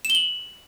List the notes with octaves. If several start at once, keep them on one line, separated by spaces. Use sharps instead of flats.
E7
G7
F#7